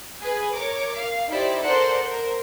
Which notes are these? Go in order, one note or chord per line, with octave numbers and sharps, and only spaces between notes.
G#4 B4
A#4 C#5 D6
F5
D#4 E4 G4 C5 D5
A4 A#4 C5 D5 F#5 C6
A#4 C5